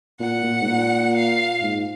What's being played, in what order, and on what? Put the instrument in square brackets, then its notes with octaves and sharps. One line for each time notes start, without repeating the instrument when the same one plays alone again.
[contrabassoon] A#2 [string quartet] F#5
[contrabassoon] A#2
G#2
A#2
[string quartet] F5
[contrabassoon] G#2